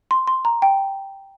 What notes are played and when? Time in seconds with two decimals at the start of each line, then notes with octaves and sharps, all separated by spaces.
0.11 C6
0.27 C6
0.45 A#5
0.62 G5